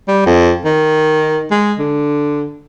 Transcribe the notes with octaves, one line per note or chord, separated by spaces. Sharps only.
G3
F2
D#3
G#3
D3